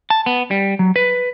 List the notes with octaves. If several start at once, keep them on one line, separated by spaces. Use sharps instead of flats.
A5
B3
G3
F#3
B4